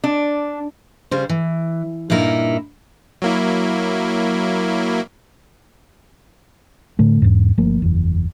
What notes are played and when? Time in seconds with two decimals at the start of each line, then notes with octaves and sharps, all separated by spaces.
0.04 D4
1.11 C#3 G3 C5
1.29 E3
2.10 G2 A#2 D#4 E4 A#4
3.22 F#3 A#3 E4
6.99 A2 D3 A3
7.22 E2 G#2
7.58 G1 F3 A3 A#3
7.82 F#1 E2